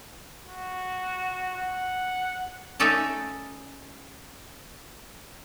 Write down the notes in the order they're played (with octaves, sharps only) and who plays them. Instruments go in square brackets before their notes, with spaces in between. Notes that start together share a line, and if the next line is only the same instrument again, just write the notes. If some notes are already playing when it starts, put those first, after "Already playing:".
[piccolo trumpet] F#4
F#5
[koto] A3 C#4 D#4 A4 D5 A5